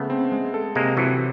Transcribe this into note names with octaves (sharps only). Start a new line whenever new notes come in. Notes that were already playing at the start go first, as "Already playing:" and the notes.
Already playing: C#3 A3 B3
C4
G#3
A4
C3 G#3 A#3
C3 E3 F#3